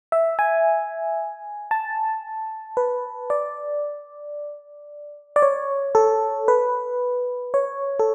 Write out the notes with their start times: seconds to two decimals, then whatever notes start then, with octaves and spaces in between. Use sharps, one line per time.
0.12 E5
0.39 G#5
1.71 A5
2.77 B4
3.30 D5
5.36 D5
5.42 C#5
5.95 A4
6.48 B4
7.54 C#5
7.99 A4